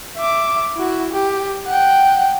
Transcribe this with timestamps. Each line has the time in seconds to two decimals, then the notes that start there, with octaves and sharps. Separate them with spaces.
0.17 E5 D6
0.76 E4 F#4
1.13 G4
1.67 F#5 G5